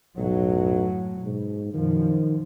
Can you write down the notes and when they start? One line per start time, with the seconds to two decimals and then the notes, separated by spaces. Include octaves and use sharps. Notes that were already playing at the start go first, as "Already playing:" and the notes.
0.18 B1 F#2 A2 F#3
1.23 G#2 B2
1.74 F#2 B2 D#3 F3